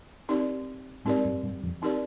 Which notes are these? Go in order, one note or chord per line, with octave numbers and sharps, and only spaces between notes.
C4 D#4 G4 A#4 D5
G#2 G#3 C4 D#4 G4 A#4 D5
G2 G3
G2 G3
F2 F3
C4 D#4 G4 A#4 D5